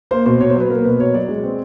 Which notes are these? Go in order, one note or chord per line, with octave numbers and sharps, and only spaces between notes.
A#3 C5
B2 C5
B2 C#5
C5
F#3
B4
A#3 A#4
B2 B4
B2 C#5
F#3 D5
G#3
C4